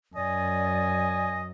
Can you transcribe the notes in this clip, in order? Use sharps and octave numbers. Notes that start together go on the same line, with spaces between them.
F#2 D5 D#5 G#5